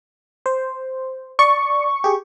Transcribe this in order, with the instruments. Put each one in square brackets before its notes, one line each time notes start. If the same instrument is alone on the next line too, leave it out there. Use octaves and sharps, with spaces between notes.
[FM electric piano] C5
[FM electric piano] D5 [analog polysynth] C#6
[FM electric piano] G4 G#4